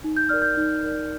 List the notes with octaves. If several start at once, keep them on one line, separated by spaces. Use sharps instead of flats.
D#4
G6
A#4 D5 F6
G6
D#4
A#4 D5